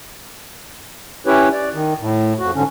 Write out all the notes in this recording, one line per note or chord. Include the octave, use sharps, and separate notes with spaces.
C#4 E4 G4 B4 C#5
D5
D#3
A2
F2 F#4
G#2 D3 C#4